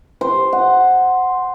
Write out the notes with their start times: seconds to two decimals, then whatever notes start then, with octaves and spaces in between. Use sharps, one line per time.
0.21 C5
0.53 F#5